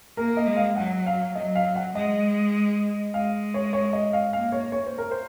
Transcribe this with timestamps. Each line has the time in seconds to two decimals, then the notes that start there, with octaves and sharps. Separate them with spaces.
0.17 A#3 A#4
0.37 D#5
0.46 G#3
0.56 F5
0.76 F#3 F#5
1.06 F5
1.35 F#3 D#5
1.55 F5
1.76 F#5
1.95 G#3 D#5
3.13 G#3 F5
3.54 C#5
3.73 C#5
3.93 D#5
4.13 F5
4.33 A#3 F5
4.52 C#5
4.72 C#5
4.86 C5
4.98 A#4
5.11 C5